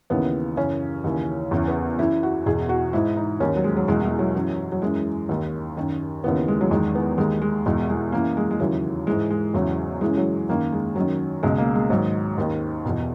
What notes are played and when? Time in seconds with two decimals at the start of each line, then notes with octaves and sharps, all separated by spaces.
0.10 D#2 C#3 E3 B3
0.57 F#2 C#3 E3 C#4
1.04 D#2 C#3 E3
1.51 E2 C#3 E3
1.68 B3
1.98 F#2 E3 E4
2.23 F#4
2.46 E2 B2 G#4
2.69 F#4
2.93 G#2 E3 E4
3.17 D#4
3.40 D#2 D#3 C#4
3.56 F#3
3.64 G#3
3.77 F#3
3.88 E2 B2 G#3
4.03 G#3
4.19 F#3
4.35 F#2 E3
4.72 F#3
4.82 F#2 E3 G#3
5.29 D#2 D#3
5.77 F#2 D#3
6.24 D#2 C#3 E3 B3
6.48 G#3
6.61 F#3
6.71 E2 D#3 G#3
6.95 B3
7.18 D#2 D#3 G#3
7.42 G#3
7.66 E2 B2 G#3
7.89 G#3
8.12 F#2 E3 A#3
8.37 G#3
8.51 G#3
8.59 D#2 C#3 E3 F#3
9.07 G#2 E3 G#3
9.30 G#3
9.54 E2 C#3 E3 F#3
10.01 F#2 C#3 E3 G#3
10.17 F#3
10.49 F#2 D#3 A#3
10.72 G#3
10.96 F#2 D#3 F#3
11.43 C#2 B2 G#3
11.58 A#3
11.75 G#3
11.90 G#2 D#3 F#3
12.38 D#2 D#3
12.85 E2 B2